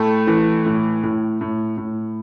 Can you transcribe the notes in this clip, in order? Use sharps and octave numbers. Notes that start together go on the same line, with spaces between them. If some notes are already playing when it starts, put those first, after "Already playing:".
Already playing: A2 A3 G5
E3
A2
A2
A2
A2